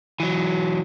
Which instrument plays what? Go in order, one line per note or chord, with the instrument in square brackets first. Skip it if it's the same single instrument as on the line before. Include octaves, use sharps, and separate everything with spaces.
[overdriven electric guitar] E3 F#3